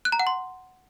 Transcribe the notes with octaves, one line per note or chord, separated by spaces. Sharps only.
F#6
A#5
F#5
C6